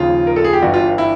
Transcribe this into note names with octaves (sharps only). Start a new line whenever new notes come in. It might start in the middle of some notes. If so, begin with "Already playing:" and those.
Already playing: D#2 C#3 F3 F4
A#4
A4
G#4
G4
G1 G2 E3 G3 F#4
F4
E4